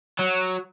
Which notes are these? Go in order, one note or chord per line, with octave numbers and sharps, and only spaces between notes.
F#3